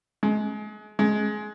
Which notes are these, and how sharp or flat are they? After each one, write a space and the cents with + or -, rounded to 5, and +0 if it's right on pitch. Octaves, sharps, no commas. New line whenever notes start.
G#3 +30
G#3 +20